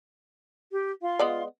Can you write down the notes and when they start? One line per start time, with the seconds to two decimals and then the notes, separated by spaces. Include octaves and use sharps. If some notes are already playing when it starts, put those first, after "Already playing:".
0.73 G4
1.01 F4 F5 C6
1.19 G#3 B3 D5